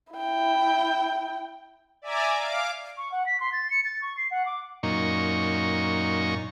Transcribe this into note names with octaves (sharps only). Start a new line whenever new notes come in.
E4 G5
D5 E5 G#5 A#5 D6
F5 D6
C#6
F#5
B6
C6
A6
C#7
A6
C#6
C7
F#5
D6
F#2 A#2 D#4 C#6